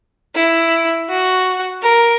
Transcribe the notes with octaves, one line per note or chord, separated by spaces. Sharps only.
E4
F#4
A#4